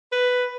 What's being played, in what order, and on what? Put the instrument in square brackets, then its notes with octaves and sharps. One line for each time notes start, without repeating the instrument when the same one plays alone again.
[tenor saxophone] B4